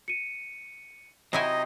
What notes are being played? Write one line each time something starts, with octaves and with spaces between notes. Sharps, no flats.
C#7 D#7
C3 F#3 D#4 E4 D#5 G#5